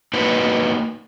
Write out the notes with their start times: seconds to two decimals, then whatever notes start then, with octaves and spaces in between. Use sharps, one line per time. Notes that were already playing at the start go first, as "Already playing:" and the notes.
0.13 A#3 D#4 F#4 B4